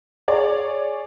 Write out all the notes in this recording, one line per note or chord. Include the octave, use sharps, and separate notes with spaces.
G#4 C#5 D5